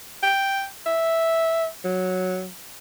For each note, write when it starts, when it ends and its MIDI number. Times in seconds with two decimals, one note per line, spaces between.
0.23 0.65 79
0.86 1.66 76
1.85 2.48 54